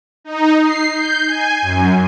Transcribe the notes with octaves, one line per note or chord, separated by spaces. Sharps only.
D#4
C7
G6
G#5
F#2